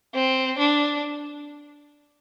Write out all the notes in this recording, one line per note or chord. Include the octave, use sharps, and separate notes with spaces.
C4
D4